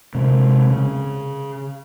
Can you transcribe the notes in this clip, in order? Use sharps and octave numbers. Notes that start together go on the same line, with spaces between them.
C3 G#3
C#3